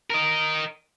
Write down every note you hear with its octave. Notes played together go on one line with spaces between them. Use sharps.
A#4 D#5